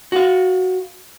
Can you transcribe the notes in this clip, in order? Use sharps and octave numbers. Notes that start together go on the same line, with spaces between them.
F#4 F5